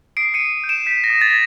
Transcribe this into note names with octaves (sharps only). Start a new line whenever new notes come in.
D#6 C7 D7
C#7 D#7
D#6
G6
D7 E7
G6 B6
A#6
D#6
A6
A#6